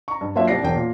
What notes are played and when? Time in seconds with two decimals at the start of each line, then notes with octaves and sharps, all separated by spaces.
0.08 A#5 C#6
0.21 G2
0.35 F#3 A#3 D4 F4 C#5 E5
0.48 C2 G4 D5 A#6 C7
0.64 E1 G5
0.75 A#2